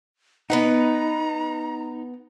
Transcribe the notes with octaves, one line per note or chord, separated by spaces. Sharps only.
B3 D#4 B4 F#5 A#5